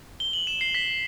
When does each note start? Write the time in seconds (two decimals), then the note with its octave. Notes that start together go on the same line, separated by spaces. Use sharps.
0.20 G7
0.33 F#7
0.47 E7
0.61 C7
0.75 B6